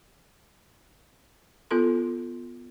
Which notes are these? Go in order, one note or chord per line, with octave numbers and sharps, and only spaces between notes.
B3 F4 A4 C6